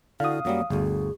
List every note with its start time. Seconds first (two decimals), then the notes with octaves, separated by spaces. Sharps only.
0.20 D3 E4 F#4 F5 D#6
0.45 F#2 F#3 G3 A#3
0.70 G1 D2 G#4